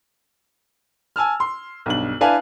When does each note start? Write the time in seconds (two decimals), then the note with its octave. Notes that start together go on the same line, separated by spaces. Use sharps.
1.16 G#5 A5 E6 F6
1.40 C6
1.86 B1 G2 F#7
2.21 D4 E4 B4 F5 G#5 A5